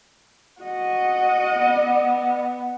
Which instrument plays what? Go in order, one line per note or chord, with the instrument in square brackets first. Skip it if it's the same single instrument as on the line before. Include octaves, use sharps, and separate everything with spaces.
[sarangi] F#4 [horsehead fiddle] D#5 F#5
[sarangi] B3